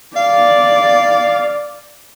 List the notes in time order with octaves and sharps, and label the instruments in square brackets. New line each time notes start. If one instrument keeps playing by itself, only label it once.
[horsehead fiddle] D5 [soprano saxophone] F5